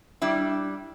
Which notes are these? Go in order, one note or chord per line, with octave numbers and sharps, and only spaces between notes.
G3 D4 E4